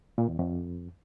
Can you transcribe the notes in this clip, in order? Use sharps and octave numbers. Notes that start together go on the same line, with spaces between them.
A#2
E2
F2